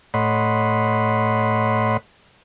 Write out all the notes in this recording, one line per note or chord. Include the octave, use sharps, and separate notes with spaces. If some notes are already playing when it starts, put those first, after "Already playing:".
A2 C#5 D#5 F#5 B5 C6